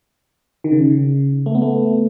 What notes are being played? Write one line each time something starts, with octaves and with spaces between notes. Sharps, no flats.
D#3
C#3
A3
B3
A3